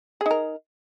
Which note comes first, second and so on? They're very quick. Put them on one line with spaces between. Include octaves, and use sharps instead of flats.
G#4 D#4 A#4